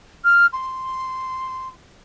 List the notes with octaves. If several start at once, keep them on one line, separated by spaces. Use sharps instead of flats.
F6
C6